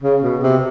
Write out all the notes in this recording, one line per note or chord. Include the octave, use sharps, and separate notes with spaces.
C#3
B2
C3